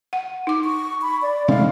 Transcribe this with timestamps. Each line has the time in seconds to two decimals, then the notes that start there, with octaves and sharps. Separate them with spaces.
0.13 F#5
0.47 D#4 D6
0.65 C#6
1.02 B5
1.22 D5
1.48 C3 G#3 A3 D#4 D#5 F5